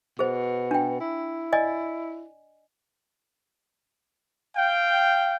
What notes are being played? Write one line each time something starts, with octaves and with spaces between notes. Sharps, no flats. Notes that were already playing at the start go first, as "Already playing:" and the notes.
B2 G#4 C5
D4 G5
E4
D5 D#5 G#5
F5 G5